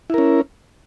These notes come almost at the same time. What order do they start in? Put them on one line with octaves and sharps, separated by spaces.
E4 A#4 C#4